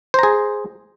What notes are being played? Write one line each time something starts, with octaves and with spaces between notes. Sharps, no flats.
G#4 C5 A#5